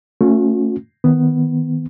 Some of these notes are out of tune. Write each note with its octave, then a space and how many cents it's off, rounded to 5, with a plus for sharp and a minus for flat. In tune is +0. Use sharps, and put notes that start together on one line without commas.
A3 +20 C#4 +0 F#4 -45
D#3 +15 B3 +10